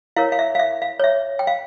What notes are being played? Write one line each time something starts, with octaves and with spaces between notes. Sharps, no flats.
E4 A#4 C#5 F5
F5
E5
F5
E5
F5
C#5
E5
G5
F5